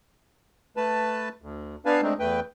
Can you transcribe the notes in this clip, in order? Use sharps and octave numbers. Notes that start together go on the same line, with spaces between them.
A3 B4 A5
D2
B3 D4 B4 F5 G#5 A5
G#3 A3 C4 D4 D#4
E2 A3 B4 G5